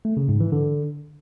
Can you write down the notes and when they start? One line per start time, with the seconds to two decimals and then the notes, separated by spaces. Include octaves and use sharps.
0.05 A3
0.17 C#3
0.29 G#2
0.40 E3
0.52 D3